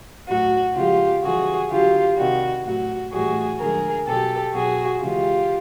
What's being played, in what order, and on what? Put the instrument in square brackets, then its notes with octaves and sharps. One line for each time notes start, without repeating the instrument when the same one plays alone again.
[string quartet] A2 F#3 F#4
C#3 F3 G#3 F4 G4
C#3 E3 G3 F#4 G#4
D3 F#3 F4 G4
C3 D#3 G3 F#4
A2 F#3 F#4
A2 E3 G3 F#4 G#4
D3 F3 G#3 G#4 A#4
B2 F#3 G4 A4
B2 F#3 F#4 G#4
C#3 E3 G#3 F4 G4